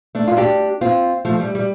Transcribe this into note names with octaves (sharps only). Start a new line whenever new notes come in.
A3 D4
F4
D4 G4
C4 F4
F3 A3
G3
G3